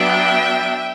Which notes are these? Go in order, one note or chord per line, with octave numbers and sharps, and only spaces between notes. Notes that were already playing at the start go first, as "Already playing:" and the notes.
Already playing: F#3 B3 D4 E5 G5